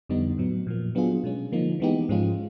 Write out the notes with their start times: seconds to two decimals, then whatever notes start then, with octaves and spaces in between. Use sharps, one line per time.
0.09 F2 D3 G3 B3 D#4
0.38 A2 F#3 B3
0.67 A#2 F3 A#3
0.95 F#3 B3 D4 F4 G#4
1.24 B2 G#3 C#4
1.52 D3 F3 A#3 D#4
1.80 E3 G#3 B3 D#4 G4
2.09 G#2 F3 G#3 C#4 F4